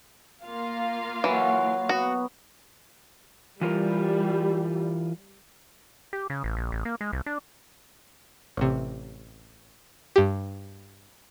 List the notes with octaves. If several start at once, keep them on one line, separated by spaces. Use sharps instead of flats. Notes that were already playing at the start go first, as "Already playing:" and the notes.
A#3 F4 F5
E3 F#3 E4
B3 F#4
E3 G3 F4 A#4
G4
C#3
A1
A#1
A1
A#3
G#3
C2
D4
A1 C3
G2 G4